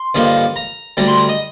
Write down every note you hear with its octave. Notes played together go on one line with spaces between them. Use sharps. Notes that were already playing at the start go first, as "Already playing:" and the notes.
Already playing: C6
G2 D3 F3 A#3 D#4
A#5
D2 D3 G3 A#5
C6
A#5
D#5